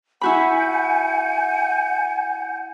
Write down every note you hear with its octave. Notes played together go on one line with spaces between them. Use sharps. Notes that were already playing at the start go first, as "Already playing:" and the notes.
E4 F#4 F#5 G#5 B5 G6